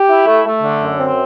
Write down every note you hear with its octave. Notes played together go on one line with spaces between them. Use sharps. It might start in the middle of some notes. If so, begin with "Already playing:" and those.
Already playing: G4
E4
A3
A3
D3
F#2
C4